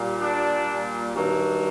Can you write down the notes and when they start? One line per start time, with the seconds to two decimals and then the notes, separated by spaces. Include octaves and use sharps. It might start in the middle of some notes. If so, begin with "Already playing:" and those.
Already playing: A#2 G3
0.22 D4
1.15 G2 D#3 F#3